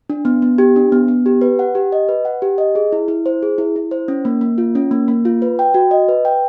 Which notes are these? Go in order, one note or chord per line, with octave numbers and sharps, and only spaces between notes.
D4
B3
B3
G4
D4
B3
B3
G4
B4
F#5
G4
D#5
B4
F#5
G4
D#5
G#4
E4
E4
C5
G#4
E4
E4
C5
C#4
A#3
A#3
F4
C#4
A#3
A#3
F4
B4
G5
F#4
D#5
B4
G5